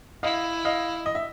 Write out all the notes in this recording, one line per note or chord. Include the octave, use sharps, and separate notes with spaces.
E4 D#5 F5
D#5 F5
D#5
E5